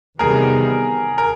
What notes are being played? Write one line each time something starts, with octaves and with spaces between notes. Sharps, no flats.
E2 C3 D#3 G3 B3 G#4 A#4
A#4